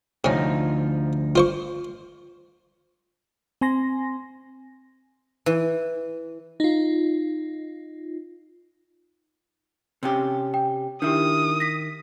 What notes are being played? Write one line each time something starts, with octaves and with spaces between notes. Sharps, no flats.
D2 C3 F3 C#4 D#4
F4 C5 C#6
C4 G#5 C6 A#6
E3
D#4 F4
C3 C#4 G4
G5
D#3 D4 E4 G4 D#6
A#6 B6